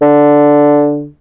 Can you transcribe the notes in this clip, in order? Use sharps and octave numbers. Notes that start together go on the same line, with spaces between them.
D3